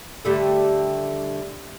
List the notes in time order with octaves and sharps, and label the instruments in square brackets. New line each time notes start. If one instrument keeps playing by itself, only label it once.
[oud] D3 G3 A3